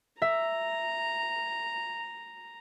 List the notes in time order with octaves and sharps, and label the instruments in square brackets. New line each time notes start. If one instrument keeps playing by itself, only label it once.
[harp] E5 [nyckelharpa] A#5